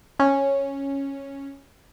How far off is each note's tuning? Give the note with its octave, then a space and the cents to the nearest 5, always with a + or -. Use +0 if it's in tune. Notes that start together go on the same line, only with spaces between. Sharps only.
C#4 -10